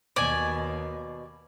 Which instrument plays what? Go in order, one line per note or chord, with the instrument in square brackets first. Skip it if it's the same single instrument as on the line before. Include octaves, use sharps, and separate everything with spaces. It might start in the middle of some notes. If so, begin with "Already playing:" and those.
[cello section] D#2 [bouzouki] B2 G#5 [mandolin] D5